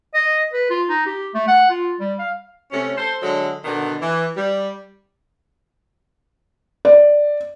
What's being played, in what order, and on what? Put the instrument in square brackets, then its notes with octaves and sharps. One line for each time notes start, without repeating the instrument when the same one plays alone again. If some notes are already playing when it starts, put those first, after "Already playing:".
[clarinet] D#5
B4
F4
D#4
G4
A3
F#5
F4
G3
F5
[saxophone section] C3 A3 C#4
A4 C5
D3 F#3 G#3 A4
B2 D3 D#3 D4
E3
G3
[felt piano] D5